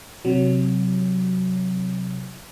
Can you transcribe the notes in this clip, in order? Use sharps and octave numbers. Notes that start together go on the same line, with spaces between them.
C3 F#3